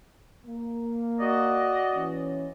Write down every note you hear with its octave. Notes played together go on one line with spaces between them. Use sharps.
A#3
F#4 D5 D#5
E3 C#4